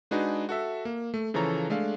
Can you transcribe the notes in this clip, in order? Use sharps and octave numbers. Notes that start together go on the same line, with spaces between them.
G#3 D4 D#4 F#4 G#4 B4
F#4 A4 E5
A#3
A3
C#3 E3 F3 A4 C#5 A#5
G#3 A3 D4 F5